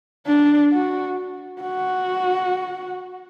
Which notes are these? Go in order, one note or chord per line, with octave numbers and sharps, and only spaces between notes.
D4
F#4
F#4